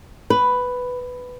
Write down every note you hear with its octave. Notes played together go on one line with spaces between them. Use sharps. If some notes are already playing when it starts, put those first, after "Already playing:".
B4